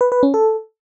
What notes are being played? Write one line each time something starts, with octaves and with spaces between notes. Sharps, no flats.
B4
B4
C#4
A4